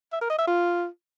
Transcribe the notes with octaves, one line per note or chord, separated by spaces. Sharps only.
E5
A#4
D#5
E5
F4